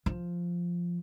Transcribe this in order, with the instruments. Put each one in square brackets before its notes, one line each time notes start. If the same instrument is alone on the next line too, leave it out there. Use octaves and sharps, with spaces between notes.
[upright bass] F3